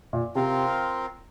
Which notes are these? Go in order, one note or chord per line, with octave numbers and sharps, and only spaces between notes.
A#2
C3 C4 F4 A#4 F5